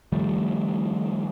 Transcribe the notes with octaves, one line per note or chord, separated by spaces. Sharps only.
D#3 F3 G3 A3